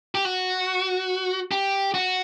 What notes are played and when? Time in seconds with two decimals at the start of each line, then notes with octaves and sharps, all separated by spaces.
0.15 G4
0.25 F#4
1.52 G4
1.94 F#4